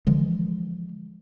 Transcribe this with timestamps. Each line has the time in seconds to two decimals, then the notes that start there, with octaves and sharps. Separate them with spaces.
0.07 D3 E3 F3 G#3